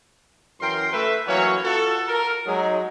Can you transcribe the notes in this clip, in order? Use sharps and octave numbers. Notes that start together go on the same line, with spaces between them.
F#2 E3 A#4 G5 C6
A3 B4 E5
E3 F#3 A#3 C#4 C#5 F#5
F4 F#4 A4
A#4
F#3 G#3 D#4